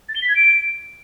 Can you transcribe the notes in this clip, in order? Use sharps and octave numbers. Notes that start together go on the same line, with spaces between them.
A6
G7
B6
G#6
D7